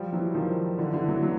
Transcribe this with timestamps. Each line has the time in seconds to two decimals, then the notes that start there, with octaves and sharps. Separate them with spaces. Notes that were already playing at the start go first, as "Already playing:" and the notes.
Already playing: F3 G3
0.12 E3 F#3
0.35 D#3 F3
0.79 D3 E3
0.93 D3 E3
1.08 E3 F#3
1.22 E3 F#3